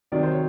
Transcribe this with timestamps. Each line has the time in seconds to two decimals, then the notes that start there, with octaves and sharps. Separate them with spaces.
0.12 C3 D#3 F#3 D5
0.23 C5
0.32 C#5